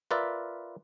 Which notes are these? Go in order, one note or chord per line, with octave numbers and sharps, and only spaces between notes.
F4 A#4 B4 D5 E5